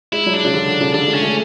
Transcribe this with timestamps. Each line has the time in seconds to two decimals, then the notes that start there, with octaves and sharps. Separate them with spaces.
0.13 G#3 E4
0.26 F#3
0.33 D4
0.45 C#3
0.53 D3
0.81 C#3
0.94 D3 D4
1.08 G#3
1.14 C#4
1.21 A3